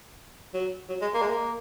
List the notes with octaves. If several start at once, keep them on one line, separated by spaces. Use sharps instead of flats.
F#3
F#3
G#3
A#3
G#3
A#3